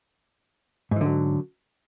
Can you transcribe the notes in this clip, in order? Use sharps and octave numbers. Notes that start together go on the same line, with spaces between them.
G#2 D3 E3 F#3